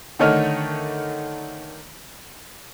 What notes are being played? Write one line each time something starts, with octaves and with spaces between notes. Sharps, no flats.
D3 D#3 A3 C#5 D#5 F6